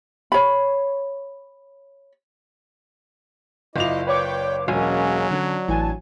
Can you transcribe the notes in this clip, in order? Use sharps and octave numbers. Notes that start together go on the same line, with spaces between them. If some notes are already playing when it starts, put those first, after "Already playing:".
C#5 B5
F#1 E4 F4 D5 D#5 F7
B4 C#5 D5 G5 D6
E1 F#3 G#3 A#3 C#4 G#5
D3 C#4 D4
A1 E3 G#5 A5